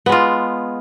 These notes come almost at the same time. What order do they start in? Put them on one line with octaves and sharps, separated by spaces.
B3 G#3 F4